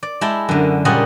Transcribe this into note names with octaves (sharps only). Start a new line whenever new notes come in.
D5
G#3 E4 G5 A5 B5
F#2 D3
A#2 C#3 G3 G#4 D#5 F#5